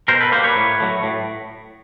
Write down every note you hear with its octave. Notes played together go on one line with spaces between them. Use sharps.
B2 A#4 C5
A4 B4
G3 A#3 A#4 C5
B4 C#5
A2
F#3 A3
A2